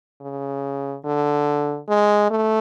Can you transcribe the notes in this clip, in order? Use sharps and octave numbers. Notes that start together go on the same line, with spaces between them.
C#3
D3
G#3
A3